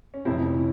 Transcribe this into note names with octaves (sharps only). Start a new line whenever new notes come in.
C#4
F1 F2 E3 C4 E4
C#4